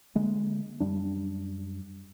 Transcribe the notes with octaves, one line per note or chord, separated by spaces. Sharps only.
D3 G#3 A#3
F#2 G3 D4